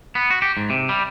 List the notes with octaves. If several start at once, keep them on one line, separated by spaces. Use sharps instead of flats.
B3
F#4
G4
G#2
C3
G3